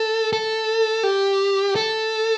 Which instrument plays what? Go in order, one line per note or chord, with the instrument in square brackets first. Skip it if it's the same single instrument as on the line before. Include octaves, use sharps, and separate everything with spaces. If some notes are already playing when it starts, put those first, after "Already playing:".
Already playing: [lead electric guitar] A4
A4
G4
A4